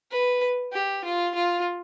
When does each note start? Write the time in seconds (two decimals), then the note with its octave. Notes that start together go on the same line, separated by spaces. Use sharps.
0.11 B4
0.73 G4
1.04 F4
1.35 F4